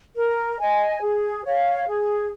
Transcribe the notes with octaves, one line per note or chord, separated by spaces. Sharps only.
A#4
D#5 G#5
G#4
C#5 F5
G#4